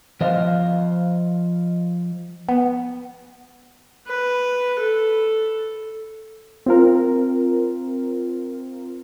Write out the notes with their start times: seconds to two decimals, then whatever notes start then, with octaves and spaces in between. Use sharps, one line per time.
0.21 F3 C5 D#5 F5
2.49 B3
4.08 B4
4.79 A4
6.66 C4 F4 A#4